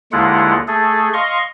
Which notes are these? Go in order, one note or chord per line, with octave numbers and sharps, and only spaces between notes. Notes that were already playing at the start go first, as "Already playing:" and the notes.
D#2 D3 G#3 E4 F4 F#5
A3 G#4 A4
D#5 F5 C6 C#6